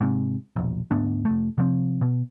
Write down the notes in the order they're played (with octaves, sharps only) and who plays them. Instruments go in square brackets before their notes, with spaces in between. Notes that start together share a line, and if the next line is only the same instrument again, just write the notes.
[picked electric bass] G#2 C3
E1 A#1
D2 G#2 B3 D4
F1 C#2 A3
C3 F3 C4
B2